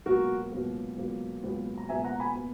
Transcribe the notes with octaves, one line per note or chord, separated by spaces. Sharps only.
C#2 B2 F#3 A#3 F#4 A#4
C#2 B2 F#3 A#3
C#2 B2 F#3 A#3
C#2 B2 F#3 A#3
A#5
C#2 B2 A#3 E5 G#5
F#5 A#5
G#5 B5
B2 A#3